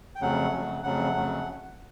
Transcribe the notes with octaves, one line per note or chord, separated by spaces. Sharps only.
G5
F2 C#3 F#3 A3 F#5
F2 C#3 F#3 A3
F2 C#3 F#3 A3 F#5
F2 C#3 F#3 A3